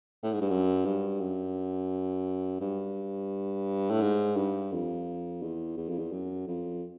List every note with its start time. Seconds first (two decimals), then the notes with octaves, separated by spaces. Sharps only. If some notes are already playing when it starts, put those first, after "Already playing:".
0.23 A2
0.32 G#2
0.41 G2
0.50 F#2
0.85 G2
1.20 F#2
2.60 G2
3.90 A2
4.01 G#2
4.36 G2
4.72 F2
5.42 E2
5.77 E2
5.88 F2
5.99 E2
6.12 F#2
6.47 F2